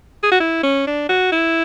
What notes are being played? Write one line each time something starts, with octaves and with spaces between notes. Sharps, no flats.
G#4
F#4
E4
C#4
D4
F#4
E4